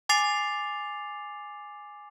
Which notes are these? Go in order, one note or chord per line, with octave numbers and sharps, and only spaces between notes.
G#5 D6 A6 C7 F7